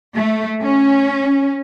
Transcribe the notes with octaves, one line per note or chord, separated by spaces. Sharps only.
A3
C#4